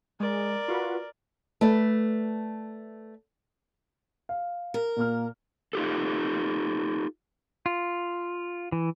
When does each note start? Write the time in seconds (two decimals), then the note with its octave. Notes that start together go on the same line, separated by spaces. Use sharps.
0.20 G#3 A#4 D5
0.68 F4 F#4 B4
1.61 A3 B4 D5
4.29 F5
4.74 A#4
4.97 A#2 A#3 F6
5.73 D#4 F4 G4 A4
7.66 F4
8.72 E3